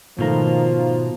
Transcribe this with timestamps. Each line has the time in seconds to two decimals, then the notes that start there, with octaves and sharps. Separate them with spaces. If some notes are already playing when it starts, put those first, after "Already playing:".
0.19 G#2 B2 D#3 F3 A3 F4 A#5